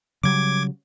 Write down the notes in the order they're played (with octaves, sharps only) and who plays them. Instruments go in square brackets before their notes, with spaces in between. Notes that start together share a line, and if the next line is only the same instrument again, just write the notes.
[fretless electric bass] C#3 F#3 G3 [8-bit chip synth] D6 G#6